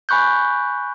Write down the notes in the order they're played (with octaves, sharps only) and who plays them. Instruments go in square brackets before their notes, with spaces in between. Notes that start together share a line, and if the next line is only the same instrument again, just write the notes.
[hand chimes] G#5 B5 C#6 F#6 G6